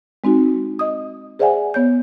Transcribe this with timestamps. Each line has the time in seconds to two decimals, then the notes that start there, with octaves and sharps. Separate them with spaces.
0.24 G#3 C4 D#4 F#4
0.79 D#5 D#6
1.39 G#4 C5 D5 E5 F#5 G#5
1.74 B3 C#5 G6